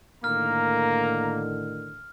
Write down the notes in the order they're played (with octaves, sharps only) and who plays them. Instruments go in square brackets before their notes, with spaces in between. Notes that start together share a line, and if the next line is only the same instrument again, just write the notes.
[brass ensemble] A2 D3 D#3 [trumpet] A#3 [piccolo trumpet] A#5 [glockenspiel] F6